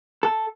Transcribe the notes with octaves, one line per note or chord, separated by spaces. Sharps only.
A4